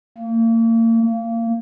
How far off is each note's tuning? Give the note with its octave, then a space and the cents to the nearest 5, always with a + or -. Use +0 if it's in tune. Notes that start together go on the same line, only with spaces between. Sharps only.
A#3 -35
A#3 -25